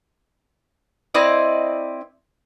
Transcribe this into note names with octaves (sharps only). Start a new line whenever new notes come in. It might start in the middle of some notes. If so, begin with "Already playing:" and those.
C4 E4 D5 D#5